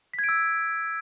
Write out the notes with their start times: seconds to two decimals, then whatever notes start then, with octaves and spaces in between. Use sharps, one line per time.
0.14 B6
0.19 G#6
0.24 D7
0.29 E6